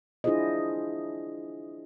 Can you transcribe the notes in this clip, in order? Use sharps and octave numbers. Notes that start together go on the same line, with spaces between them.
D4 E4 F4 G#4 C5 D#5